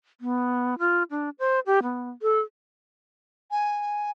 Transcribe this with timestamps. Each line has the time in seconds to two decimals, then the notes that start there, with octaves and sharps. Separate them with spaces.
0.21 B3
0.79 F4
1.10 D4
1.39 C5
1.66 G4
1.83 B3
2.22 A4
3.51 G#5